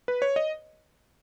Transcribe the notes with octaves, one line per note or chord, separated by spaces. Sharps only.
B4
C#5
D#5